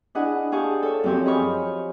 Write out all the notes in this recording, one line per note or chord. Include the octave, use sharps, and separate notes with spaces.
D4 E4 G#4 D#5 F#5
G4 G#4 F5 A5 C#6
A4 C#5
F#2 F3 C4 G4 C#5
G#4 D#5 B5 C#6 F6